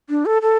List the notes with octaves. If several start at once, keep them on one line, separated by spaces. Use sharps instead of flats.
D4
A4
A4